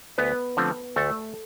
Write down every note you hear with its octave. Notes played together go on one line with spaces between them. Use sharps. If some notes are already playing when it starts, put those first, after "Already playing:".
D2 B3 B4
D3 F3 A3 C4
D2 A3 A4